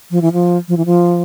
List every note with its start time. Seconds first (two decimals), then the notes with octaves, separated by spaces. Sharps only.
0.11 F3
0.22 E3
0.33 F3
0.68 F3
0.77 E3
0.86 F3